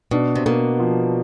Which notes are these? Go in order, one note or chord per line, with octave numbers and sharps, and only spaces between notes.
B2 D4
C3
B2 A#3
F3